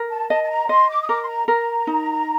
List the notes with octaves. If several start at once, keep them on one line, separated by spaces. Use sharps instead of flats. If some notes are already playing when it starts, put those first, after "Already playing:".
Already playing: A#4
A5
D#5 A5
A5
A#5
D#5 C6
D6
D#6
A#4 D6
C6
A#5
A#4 A#5
D#4